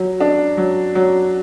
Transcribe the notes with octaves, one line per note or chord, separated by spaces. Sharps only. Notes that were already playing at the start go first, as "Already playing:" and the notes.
Already playing: F#3
D4
F#3
F#3